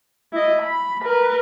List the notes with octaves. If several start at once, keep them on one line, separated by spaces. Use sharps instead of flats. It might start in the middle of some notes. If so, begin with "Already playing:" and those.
E4 D#5
B5
A#4 B4